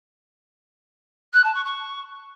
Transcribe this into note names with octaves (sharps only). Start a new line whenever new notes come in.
F#6
A5
C#6
C#6